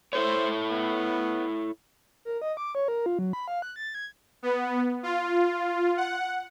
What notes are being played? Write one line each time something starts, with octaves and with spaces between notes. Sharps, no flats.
E4 A4 C5 C#5
B3
A#4
D#5
D6
C#5
A#4
F4
F#3
B5
F5
F#6
A6
G#6
B3
F4
F#5